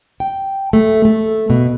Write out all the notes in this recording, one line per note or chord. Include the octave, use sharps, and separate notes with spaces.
G5
A3
A3
B2